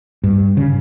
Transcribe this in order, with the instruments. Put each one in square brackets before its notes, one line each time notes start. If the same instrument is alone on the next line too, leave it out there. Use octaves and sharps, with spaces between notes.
[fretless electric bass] G2
C#3